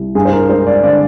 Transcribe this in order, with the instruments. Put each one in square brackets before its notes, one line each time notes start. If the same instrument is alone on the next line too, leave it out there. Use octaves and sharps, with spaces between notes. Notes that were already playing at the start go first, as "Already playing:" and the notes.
Already playing: [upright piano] C2
G2 G#4
C5
A#4
G#3 C5
D5
D3 D5